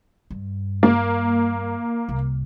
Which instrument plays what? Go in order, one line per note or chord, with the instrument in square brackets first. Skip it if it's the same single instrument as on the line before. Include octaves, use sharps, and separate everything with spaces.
[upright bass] G2
[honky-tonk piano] A#3
[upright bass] C2